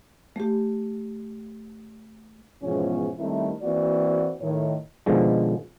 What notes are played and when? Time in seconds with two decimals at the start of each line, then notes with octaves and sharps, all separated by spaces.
0.36 A3 G4
2.62 E2 G#2 B2 F3 C#4
3.18 D#3 G3 A3 C4 C#4 E4
3.62 E3 A#3 C4 F#4 D5
4.41 A2 D#3 C#5
5.06 B2 D3 D#3 F3 G#3